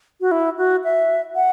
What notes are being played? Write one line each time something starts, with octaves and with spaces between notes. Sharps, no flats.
F#4
E4
F#4
E5
F#5